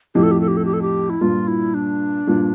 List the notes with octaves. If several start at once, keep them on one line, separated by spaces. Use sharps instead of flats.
F2 A2 G4
A4
G4
A4
G4
A4
G4
A4
G4
E4
G2 A#2 F4
E4
D4
G2 A#2